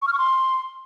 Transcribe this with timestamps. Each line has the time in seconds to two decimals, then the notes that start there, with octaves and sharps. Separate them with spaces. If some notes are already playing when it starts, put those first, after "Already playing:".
0.02 C#6
0.07 F6
0.13 C#6
0.18 C6